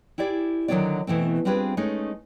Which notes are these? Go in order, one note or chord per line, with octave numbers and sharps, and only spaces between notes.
E4 G4 G#4 D5
D3 D#3 F#3 C#4 C#5 D5
B2 E3 A3 C4
G3 C4 D4 F4 G#4 B4
G#3 A3 C#4 D#4